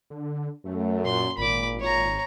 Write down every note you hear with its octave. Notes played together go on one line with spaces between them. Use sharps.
D3
F#2 A3
A#2 C6
G#1 A#2 B5 D6
A#2 C#5 A#5